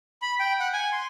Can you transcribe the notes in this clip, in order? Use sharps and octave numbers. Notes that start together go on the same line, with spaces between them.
B5
G5
F#5
G#5
C6